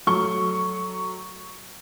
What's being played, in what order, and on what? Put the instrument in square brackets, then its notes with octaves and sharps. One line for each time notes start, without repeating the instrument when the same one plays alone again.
[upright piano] F#3 A3 C#6 G7